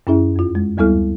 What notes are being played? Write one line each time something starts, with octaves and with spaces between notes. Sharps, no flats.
F#2 C#4 E4 G#4 E5
F2 F4
G#3
D2 G3 B3 E4 A4 F6